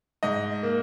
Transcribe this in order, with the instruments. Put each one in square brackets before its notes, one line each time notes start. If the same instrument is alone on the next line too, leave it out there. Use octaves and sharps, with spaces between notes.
[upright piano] G#2 D#5
A#3